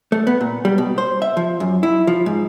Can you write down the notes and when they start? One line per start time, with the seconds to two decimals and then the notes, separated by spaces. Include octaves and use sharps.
0.12 A3
0.27 B3
0.41 A#2
0.65 G3
0.78 B2
0.98 C5
1.22 E5
1.37 F3
1.60 F#2
1.83 E4
2.07 F3
2.26 G#2